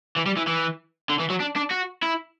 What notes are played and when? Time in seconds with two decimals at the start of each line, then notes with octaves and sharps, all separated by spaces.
0.17 E3
0.26 G3
0.37 E3
0.47 E3
1.09 D3
1.20 E3
1.30 F#3
1.40 D4
1.56 D4
1.71 F#4
2.03 E4